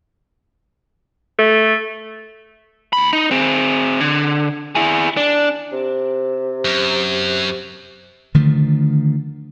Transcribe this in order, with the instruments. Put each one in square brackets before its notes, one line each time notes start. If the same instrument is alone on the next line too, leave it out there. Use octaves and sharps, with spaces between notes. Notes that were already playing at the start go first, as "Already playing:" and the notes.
[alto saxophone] A3
[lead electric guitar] D2 B5
D#4
C4 G#4
D3
E4 G#4
D4
[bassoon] C3
[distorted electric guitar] F#2
[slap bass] D3 D#3 F3 A3